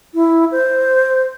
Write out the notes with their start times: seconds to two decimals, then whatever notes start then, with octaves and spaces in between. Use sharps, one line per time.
0.15 E4
0.52 C5